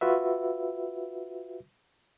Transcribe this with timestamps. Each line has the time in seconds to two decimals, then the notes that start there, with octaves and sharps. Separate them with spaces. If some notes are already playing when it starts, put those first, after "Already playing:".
0.01 F4 F#4 B4 E5